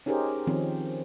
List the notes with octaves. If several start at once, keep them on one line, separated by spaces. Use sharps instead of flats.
C#4 D#4 G4 G#4 A#4 C5
D#3 F3 C4 C#4